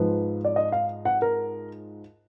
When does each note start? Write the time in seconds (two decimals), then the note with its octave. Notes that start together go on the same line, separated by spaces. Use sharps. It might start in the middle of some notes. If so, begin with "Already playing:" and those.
Already playing: G#2 F3 B4
0.45 D5
0.56 D#5
0.72 F5
1.05 F#5
1.22 A#4